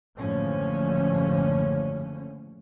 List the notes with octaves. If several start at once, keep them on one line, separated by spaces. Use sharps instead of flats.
F#1 A2 D3 F3 C#4